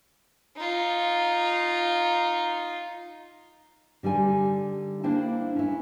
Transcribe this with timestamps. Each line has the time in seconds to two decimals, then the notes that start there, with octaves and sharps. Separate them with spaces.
0.56 D#4 F4
4.03 D3 G3 D#4 G#5
5.03 A#3 D4 E4 C5 G5 A5
5.56 C#4 E4